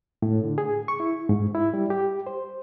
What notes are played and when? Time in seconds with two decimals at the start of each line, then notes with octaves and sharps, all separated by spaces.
0.22 A2
0.44 D3
0.58 G#4
0.88 C#6
1.00 E4
1.29 G#2
1.55 E4
1.74 G3
1.90 G4
2.27 C5